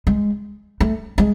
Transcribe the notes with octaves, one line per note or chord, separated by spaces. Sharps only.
G#3
A3
G#3